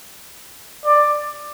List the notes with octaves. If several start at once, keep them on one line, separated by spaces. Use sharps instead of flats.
D5